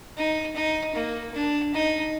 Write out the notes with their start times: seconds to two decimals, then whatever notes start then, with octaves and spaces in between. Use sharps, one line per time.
0.17 D#4
0.56 D#4
0.95 A#3
1.34 D4
1.74 D#4